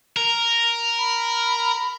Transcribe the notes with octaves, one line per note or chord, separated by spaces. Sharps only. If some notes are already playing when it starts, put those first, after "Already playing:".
A#4
B5